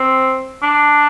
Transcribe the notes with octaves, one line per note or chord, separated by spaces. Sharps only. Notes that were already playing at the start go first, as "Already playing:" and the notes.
Already playing: C4
D4